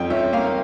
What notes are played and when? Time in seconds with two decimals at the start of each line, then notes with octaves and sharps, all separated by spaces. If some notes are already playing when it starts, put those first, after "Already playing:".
Already playing: F2 C#4 G5
0.10 C#4 E5
0.33 A#3 F5